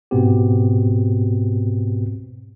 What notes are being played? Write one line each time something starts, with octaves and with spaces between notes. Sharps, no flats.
G#2 B2 B3 C4 F#4 G4